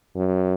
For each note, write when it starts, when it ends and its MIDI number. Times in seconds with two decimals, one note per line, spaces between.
0.16 0.54 42